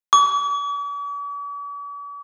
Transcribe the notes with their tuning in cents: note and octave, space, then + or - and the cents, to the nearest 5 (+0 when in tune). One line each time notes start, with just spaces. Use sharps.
D6 -45